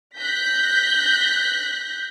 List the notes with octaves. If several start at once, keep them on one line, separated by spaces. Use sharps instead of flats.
F#6 G6 A#6 B6